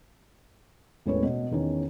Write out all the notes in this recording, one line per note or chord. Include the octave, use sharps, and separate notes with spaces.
E1 A2 C#4 B4 C#5
B2
E2 D#3 C#4